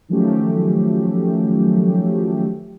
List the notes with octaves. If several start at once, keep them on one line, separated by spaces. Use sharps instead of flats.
D#3 F3 F#3 A3 C#4 G4